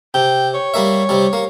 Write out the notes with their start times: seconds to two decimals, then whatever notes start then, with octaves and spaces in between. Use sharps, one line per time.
0.14 C3 G5
0.54 C#5
0.74 G3 A#3 E5
1.09 C3 G3
1.33 A#3